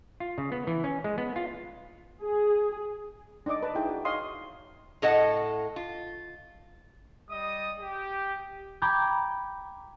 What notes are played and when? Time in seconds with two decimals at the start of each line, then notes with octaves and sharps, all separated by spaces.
0.20 F4
0.38 C#3
0.52 B3
0.67 E3
0.84 C#4
1.04 G#3
1.18 B3
1.36 F4
2.24 G#4
3.46 D4 D#4 D5 D#5 D6
3.63 B4 A5
3.75 D#4 E4 G#4 G5
3.89 F#4
4.05 C#5 D#5 F5 C6 D#6
5.02 A2 A4 D#5 F#5
5.76 F4
7.30 G3 D#5 D#6
7.79 G4
8.82 G5 A#5 B5 D6 G6 G#6